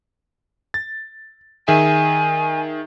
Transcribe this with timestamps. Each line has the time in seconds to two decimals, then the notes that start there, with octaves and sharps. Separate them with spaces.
0.74 A6
1.68 D#3 G#4 E5 G#5